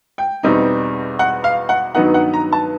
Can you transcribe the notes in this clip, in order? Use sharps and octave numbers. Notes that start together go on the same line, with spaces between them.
G5
E2 B2 G3 C4 D#4
F#5
F5
F#5
G2 D#3 F#3 B3 D#4 F#5
F#5
A#5
A5